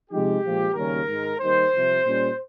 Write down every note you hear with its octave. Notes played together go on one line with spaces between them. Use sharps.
C3 F3 G#3 D#4 G4
A#2 F3 G#3
D#2 C#3 G3 C#4 A#4
G#2 D#3 G#3
D#2 D#3 G3 C5
C2 C3 F3
A#2 G3 C#4